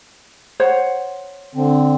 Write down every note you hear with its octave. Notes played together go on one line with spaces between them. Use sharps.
C5 C#5 F#5
D3 C4